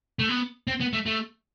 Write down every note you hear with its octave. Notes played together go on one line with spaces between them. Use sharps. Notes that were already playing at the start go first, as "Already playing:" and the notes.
A3
B3
C4
B3
A3
A3